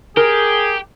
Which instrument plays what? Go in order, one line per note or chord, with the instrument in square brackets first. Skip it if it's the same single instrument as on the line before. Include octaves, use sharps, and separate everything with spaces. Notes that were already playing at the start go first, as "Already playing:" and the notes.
[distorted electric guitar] G4 [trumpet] G#4 [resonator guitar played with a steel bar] A#4